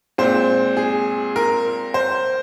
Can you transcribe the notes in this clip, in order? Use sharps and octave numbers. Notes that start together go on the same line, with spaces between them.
A#2 G#3 C4 C5
G#4
A#4
C5